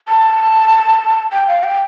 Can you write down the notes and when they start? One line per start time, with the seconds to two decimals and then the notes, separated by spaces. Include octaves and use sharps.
0.08 A5
1.33 G5
1.48 F5
1.63 G5